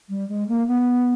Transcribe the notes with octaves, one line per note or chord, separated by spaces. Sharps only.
G3
G#3
A#3
B3